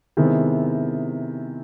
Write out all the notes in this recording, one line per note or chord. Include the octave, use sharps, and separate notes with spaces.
C3 D#3 G#3 B3 E4